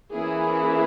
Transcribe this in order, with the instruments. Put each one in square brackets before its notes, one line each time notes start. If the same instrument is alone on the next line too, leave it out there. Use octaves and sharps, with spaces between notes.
[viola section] E3 A#3 C#4 E4 G#4